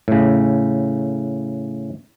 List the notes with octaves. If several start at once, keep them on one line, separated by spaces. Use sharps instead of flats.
A2 C#3